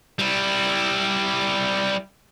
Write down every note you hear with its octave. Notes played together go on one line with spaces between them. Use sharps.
G3 E4